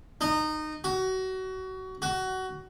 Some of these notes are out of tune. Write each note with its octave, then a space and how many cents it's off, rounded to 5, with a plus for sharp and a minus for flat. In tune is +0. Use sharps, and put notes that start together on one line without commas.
D#4 -20
F#4 +25
F#4 +20